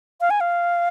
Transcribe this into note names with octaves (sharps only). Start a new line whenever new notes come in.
F5
G#5
F5